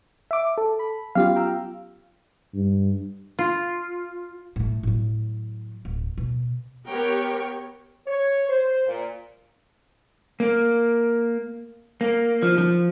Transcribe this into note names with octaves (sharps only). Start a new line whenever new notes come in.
E5 D6
A4
B5
F#3 B3 C#4 F4 G4 F5
G5 A#5 E6
G2
F4
A2 A3
A2 F#3
D1
B2
B3 G4 A#4 C#5 G5
C#5
C5
A#2
A#3
A#3
F3
F3